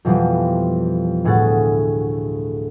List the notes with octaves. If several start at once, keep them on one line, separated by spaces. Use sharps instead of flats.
F2 B2 E3 F3 G3
D2 A2 G#4 F#5 A6